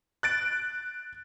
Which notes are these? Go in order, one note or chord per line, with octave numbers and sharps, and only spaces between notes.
F#6 A6 D7